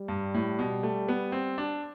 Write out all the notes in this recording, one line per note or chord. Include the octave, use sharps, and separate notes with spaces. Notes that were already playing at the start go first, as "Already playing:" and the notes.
Already playing: G3
G2
A2
B2
A3
B3
C4
D4